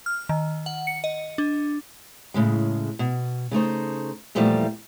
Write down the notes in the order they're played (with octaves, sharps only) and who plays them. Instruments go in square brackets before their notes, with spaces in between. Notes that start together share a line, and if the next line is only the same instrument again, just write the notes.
[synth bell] F6
D#3
F#5
C#7
D#5
D4
[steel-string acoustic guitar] A2 C#3 G#3
B2
C#3 A3 D#4 C5
E2 A#2 F3 G3 A3